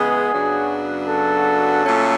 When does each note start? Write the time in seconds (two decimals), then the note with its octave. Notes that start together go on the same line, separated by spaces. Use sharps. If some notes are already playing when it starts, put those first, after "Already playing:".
Already playing: C#3 E3 G#3 B3 G#4
0.33 F#2 C#3 F#3 B3 D4
1.08 A4
1.84 A#2 F#3 A3 C#4